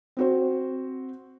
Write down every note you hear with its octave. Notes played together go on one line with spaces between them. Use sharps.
C4 F#4 C5